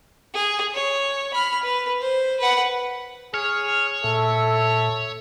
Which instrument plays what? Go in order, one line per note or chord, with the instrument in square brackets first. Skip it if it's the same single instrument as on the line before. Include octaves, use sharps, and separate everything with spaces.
[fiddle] G#4
C#5
B5 F6
B4
C5
B4 F#5
[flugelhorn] G#4 [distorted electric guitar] C#5 [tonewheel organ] F6
[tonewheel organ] A#2 [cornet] A4 [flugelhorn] E5